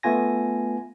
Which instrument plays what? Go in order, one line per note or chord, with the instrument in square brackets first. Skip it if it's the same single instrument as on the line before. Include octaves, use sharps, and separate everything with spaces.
[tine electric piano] A3 B3 F4 G#5 A#6